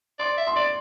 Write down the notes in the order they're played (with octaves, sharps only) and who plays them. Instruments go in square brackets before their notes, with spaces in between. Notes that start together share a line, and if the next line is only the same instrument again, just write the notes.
[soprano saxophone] D5 [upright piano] C6
[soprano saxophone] E5
[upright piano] C6
[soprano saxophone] D5